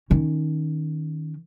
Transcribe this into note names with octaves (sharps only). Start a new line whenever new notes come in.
D#3 C#4